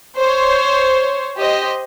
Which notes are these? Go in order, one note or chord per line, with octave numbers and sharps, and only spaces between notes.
C5 C#5
G4 C5 D#5